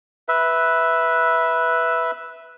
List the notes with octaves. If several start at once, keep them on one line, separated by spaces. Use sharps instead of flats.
B4 E5